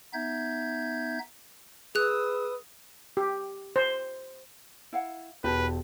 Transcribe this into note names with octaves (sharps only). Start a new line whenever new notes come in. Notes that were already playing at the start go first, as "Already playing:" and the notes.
B3 D#4 E5 G6 G#6
G#4 B4 D#6 E6 F#6 F7
G4
C5
E4 F5 F#5
E1 G4 B4 A5